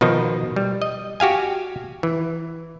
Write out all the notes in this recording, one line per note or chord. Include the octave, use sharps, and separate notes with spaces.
B2 D#3 F3 D#4
G3
D#5
F#4 G4 F5 G#5
E3